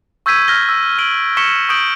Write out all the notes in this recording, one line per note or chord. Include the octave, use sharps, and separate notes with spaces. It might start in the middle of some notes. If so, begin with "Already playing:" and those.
C#6 E6 G6 G#6 B6 D#7
F6 A#6 G7
E6
F6 D7 F#7 G7
C#6 B6 C#7 E7 G7
C#6 D#6 G6 D7 F#7